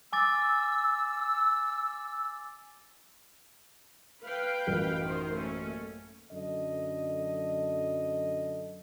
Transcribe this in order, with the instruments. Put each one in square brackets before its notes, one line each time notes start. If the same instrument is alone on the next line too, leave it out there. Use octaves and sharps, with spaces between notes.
[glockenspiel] G#5 D6 A6 [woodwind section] E6
[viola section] B4 F5 G5
[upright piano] A1 F#2
[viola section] D#3 A#4 C5
A3 A#3 C#4
[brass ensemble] F#2 D3 A4 D#5